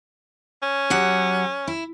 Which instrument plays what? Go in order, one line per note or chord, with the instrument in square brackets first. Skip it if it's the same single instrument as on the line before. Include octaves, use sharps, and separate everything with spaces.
[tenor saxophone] C#4
[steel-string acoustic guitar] F#3 G4 F#5
E4